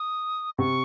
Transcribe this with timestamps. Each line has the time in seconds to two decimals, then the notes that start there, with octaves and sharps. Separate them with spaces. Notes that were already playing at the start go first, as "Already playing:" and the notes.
Already playing: D#6
0.58 C3 C#6